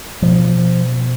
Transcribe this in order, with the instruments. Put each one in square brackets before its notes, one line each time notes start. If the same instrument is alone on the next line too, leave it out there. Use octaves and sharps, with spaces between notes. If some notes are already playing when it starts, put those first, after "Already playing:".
[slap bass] B2 F3